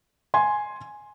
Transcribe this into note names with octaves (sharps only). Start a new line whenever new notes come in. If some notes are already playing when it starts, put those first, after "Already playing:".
G#5 C6